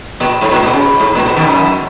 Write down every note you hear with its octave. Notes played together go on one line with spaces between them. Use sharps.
A#2
G#2
A#2
B2
C#3
G#2
A#2
B2
B2 D#3
F#2